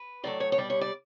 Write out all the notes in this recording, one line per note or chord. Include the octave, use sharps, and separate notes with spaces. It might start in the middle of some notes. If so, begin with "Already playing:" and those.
Already playing: B4
A2 F#3 A3 D5
C#5
C#5
B2 G3 D5
C#5
D5